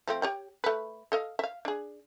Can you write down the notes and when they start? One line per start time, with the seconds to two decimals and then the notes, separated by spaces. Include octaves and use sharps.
0.08 F3 A3 C4
0.22 G4 C#5 G5
0.64 A3 B4
1.12 A4 D#5 F5
1.39 E5 F5
1.65 D4 G#4